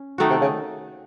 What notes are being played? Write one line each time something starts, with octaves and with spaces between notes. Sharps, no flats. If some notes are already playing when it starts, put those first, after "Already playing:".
Already playing: C#4
D#3 A3 D#4 F#4
C3
C#3